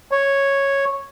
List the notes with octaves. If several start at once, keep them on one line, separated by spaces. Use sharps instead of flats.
C#5